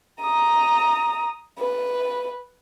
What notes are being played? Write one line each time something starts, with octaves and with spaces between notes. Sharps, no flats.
A#5 D#6
B4